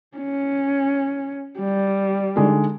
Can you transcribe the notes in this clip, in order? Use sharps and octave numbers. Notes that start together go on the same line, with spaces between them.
C#4
G3
D3 G#3 D#4